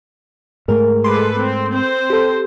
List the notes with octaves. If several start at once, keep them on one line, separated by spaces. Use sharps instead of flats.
G#2 A3 G#4 A#4
G#3 A4 B4 C6 D6
C4
C4 C5
G4 A4